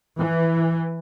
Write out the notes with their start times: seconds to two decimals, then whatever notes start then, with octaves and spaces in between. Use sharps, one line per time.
0.18 E3